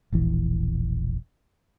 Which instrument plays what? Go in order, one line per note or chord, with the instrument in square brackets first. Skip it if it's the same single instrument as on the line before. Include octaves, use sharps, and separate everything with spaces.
[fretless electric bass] E1 A#1 E3